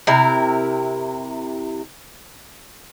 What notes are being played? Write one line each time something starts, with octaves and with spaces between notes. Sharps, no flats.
C3 E4 A#4